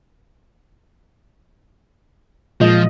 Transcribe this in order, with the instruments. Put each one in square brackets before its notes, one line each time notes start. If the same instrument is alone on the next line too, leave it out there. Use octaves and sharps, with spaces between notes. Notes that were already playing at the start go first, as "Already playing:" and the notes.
[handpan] A#2 G#3 D#5 [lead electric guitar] F3